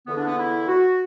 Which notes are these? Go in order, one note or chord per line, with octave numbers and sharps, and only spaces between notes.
E2 D3 B3
D4
B3
E4
F#4